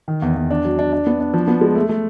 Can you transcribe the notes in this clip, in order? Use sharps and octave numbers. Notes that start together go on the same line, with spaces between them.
D#3
E2
E2
D4
F#3
D4
D4
B3
D4
F3
B3
G#3
A3
A3